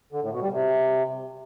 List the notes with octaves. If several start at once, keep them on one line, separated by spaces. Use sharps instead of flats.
D3
A2
B2
G3
C3